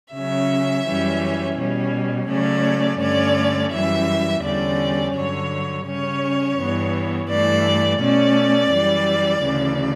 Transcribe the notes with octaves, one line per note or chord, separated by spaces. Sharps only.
C#3 F#3 C#4 E5
F#2 E3 G3 C#4
B2 G3 C#4
C#3 F#3 A3 C#4 D5
G2 D3 A3 C#4 D5
F#2 E3 G3 E5
E2 D3 G3 C#4 D5
G2 D3 F#3 C#5
C#3 G3 C#4 C#5
G2 E3 B3
G2 E3 A3 D5
B2 A3 C#4 D5
F#2 E3 G3
D2 C#3 E3